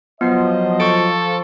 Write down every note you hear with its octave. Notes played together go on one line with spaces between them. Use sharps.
F3 F#3 B3 C5 D#5 C7
A4 C#6 D7